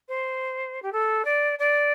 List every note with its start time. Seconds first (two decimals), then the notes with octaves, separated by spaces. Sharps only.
0.08 C5
0.82 G4
0.92 A4
1.25 D5
1.59 D5